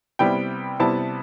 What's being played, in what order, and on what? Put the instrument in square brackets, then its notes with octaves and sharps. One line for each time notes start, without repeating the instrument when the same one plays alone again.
[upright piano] C3 G3 B3 E4 G5
C3 G3 B3 E4 A5